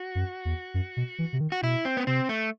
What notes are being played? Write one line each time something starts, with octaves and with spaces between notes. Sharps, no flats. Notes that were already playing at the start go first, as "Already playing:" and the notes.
Already playing: F#4
F#2
E2
F#2
B2
E3
C3
D#3
F#4
B2 E4
C4
B3
C3 C4
A3